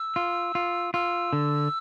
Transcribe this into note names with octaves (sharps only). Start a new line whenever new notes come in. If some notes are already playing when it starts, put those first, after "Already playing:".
Already playing: E6
F4
F4
F4 E6
D3